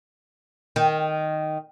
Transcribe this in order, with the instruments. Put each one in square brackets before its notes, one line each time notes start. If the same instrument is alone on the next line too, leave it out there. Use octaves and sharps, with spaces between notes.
[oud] D#3